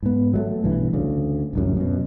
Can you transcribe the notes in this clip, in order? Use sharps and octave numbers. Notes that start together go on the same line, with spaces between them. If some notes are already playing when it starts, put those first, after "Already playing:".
G#2 B3
F#3 G#3 A3
B1 G2 E3
D2 C#3
D1 C2 F#2
F#2 B2